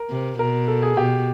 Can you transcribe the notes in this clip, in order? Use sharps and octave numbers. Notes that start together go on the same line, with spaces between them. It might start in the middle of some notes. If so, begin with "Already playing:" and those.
Already playing: A#4
C3
B2 A#4
A4
G#4
B2 G4